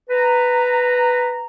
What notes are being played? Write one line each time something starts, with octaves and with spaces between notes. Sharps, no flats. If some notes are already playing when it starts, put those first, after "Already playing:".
B4 A#5